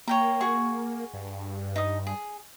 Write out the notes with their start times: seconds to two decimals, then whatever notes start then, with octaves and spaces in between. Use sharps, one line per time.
0.08 A#3 C#5 G5 A#5
0.41 F#4 G#4 C#6
1.14 G2
1.76 D#4 D#6
2.07 G#4